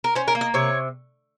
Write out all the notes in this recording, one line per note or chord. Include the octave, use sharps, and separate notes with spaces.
A#4
C#4 C5
A#4
A#3
D#5
C3 C#5